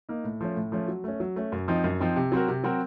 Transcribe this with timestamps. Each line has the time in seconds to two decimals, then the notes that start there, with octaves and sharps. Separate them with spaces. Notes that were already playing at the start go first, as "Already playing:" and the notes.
0.09 A#3 D#4
0.24 A2
0.41 F3 A3 C#4
0.56 A2
0.72 F3 A3 C#4
0.88 F#3
1.04 A3 C#4
1.20 F#3
1.36 A3 C#4
1.52 F#2
1.68 F3 C4 D#4
1.84 F#2
2.00 F3 C4 D#4
2.16 C3
2.32 F#3 C4 F#4 A#4
2.48 C3
2.64 F#3 C4 F#4 A#4